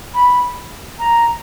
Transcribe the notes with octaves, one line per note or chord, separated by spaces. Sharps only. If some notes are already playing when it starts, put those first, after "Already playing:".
B5
A#5